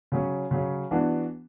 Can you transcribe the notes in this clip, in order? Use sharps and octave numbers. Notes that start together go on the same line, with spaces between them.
C#3 F#3 C#4
C#3 F#3 C#4
E3 B3 D4 F#4